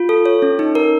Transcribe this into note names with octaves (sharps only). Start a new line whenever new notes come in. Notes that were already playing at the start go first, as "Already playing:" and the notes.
Already playing: F4
A4
C#5
C#4
D#4
A#4